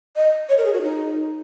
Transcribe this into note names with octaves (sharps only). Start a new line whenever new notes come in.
D#5
C#5
A#4
G#4
F#4
D#4